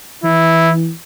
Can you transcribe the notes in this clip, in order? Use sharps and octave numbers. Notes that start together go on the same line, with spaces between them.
E3 E4